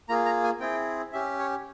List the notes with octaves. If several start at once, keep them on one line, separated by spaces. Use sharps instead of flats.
A#3 F4 G#4 A#5
A#5
G#5
C4 E4 G#4 G5
C#4 G4 E5
C#5